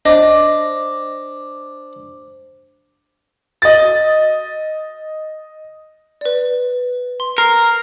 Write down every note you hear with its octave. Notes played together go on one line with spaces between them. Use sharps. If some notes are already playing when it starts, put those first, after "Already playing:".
D4 C5 D#5 D6
D#5 A6
B4 D5
C6
A#4 F6 C7